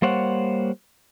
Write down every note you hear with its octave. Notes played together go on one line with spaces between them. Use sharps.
G3 A#3 C5 C#5 F#5